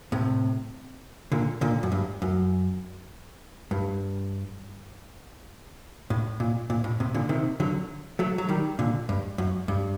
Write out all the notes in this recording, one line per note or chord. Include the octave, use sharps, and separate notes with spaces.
A2 C3
A#2 D3
A#2 D3
F#2
G2
F#2
G2
A2
A#2
A#2
A2
A2 C3
A#2 D3
C3 D#3
D3 F#3
F#3 A3
F#3
D#3 G3
A#2 D3
G2
F#2
G2